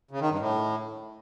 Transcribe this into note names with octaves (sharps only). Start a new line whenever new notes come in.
C#3
D#3
G2
A2